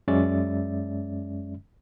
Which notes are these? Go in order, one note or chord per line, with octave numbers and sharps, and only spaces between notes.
F#2 G#3 C#4 D5 E5 A6